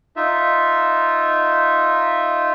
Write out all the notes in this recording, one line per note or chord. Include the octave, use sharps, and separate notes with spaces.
D#4 F4 E5